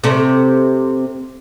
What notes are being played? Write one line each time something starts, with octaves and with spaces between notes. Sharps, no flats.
C3 A3